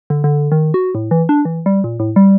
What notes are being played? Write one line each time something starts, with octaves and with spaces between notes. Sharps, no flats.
D3
D3
D#3
F#4
A2
E3
D4
E3
G3
A#2
A2
G3